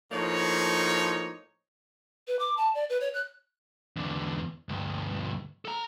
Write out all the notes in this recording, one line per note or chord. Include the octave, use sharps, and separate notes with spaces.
A2 F3 A#3 D#4 C#5
B4
D6
A5
D5
B4
C#5
F#6
E2 D3
D2 G2
A4 A#5